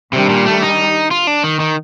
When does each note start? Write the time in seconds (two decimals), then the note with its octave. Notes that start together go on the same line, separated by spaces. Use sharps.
0.13 C3 D#3 G3 D4
0.29 A#2
0.46 A3
0.62 D#4
1.11 F4
1.27 D4
1.44 D#3
1.60 D#3